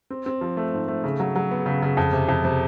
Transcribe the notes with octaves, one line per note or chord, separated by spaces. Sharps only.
C4
C4
F3
A3
G#2
A3
C#3
F#3
F#3
B3
C#3
C#3
F2
C3
F2
C3